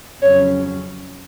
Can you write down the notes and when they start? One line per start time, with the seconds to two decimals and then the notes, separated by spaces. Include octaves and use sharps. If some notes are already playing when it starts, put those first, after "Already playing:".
0.21 F2 C#3 F#3 C#4 C#5